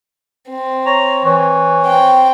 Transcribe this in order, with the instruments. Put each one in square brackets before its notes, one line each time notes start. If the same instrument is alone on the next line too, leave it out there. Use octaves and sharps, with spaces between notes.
[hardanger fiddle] C4
[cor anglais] C#5 [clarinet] A#5
[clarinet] E3 [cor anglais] C#5
[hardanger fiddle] C4 G5